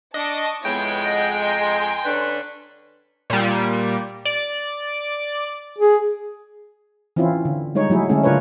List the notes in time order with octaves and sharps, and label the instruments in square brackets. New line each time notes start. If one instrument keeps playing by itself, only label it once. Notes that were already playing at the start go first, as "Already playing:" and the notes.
[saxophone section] D4 [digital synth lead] D#5 [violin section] A5 C#6 D6
[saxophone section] F2 G#3 [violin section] B3 E4 C#5 [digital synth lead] G5
[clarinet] D#5 [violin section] F#5
[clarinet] D#5 [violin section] G#5 A#5 C6
[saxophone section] D3 C#4 D4 [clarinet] B4
[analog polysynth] A#2 G3
D5
[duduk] G#4
[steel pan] E3 C4 C#4 E4 F4
D3
G3 G#3 D#4 C#5
F#3 A3 E4 G#4
D3 G#3 A3 C#4 A4
C#3 D4 F4 A#4 B4 C#5